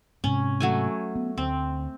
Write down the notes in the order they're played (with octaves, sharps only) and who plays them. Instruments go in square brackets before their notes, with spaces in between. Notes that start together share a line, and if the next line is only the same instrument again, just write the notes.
[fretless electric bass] G#2 C3 [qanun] C#4
[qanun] F#3 A3 G#5
[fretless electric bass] B3
[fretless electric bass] D2 [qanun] C4